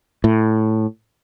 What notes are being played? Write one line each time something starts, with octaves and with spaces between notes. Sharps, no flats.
A2